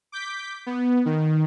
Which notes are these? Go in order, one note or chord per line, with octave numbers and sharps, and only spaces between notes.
D6 G6 B6
B3
D#3